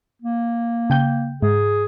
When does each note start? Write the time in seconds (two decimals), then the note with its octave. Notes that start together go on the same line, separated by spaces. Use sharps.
0.22 A#3
0.90 C#3 G5 G6
1.42 G#2 G#4